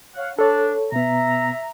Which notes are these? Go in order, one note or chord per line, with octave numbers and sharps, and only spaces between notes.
C#5 F5 F#5
D4 A4 C#5
B2 B3 E5 A#5